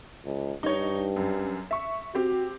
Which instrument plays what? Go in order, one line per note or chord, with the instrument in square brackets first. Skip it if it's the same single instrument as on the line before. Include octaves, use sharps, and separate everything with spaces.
[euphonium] C#2
[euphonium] G2 [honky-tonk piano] D#4 C#5
[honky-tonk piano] F#2
E5 C#6
[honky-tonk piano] C4 G4 [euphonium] F#4